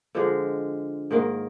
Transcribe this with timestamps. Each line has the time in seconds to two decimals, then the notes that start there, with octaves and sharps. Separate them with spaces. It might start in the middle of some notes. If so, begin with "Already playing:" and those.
0.15 D3 F3 G#3
1.11 G#2 D#3 A#3